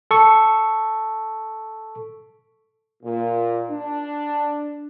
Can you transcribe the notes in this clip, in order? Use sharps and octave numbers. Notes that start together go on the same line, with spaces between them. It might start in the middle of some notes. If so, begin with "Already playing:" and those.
A4 C#6
A#2
D4